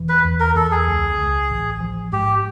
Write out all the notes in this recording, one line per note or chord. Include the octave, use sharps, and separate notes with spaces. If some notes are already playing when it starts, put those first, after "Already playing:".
Already playing: E1 E3
B4
E2
A#4
E2 A4
G#4
C#2
C#2
A1
F3
G#2 G4